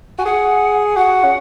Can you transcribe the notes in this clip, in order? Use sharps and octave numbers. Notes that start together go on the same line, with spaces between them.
F#4 G#5
G#4 F#5
F#4 F#5
C#4